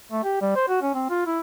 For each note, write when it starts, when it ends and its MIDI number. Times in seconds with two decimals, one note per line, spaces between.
0.11 0.23 57
0.24 0.37 67
0.41 0.54 55
0.56 0.67 72
0.68 0.81 66
0.82 0.93 61
0.94 1.06 60
1.10 1.25 65
1.26 1.40 64